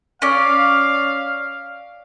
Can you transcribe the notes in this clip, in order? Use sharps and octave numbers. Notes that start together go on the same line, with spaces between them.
C#4 D5 F5